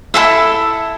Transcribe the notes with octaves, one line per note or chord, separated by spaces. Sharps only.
E4 G#4 A4 E5